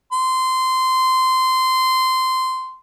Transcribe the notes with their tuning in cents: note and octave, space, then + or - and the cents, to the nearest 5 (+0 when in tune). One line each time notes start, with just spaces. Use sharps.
C6 -15